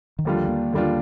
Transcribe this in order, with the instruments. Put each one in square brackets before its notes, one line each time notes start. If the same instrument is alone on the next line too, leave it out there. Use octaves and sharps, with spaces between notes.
[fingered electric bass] D#3
[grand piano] D#2 D3 G3 D4 F4 [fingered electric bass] F3
[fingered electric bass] A#3
[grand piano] D#2 D3 G3 D4 F4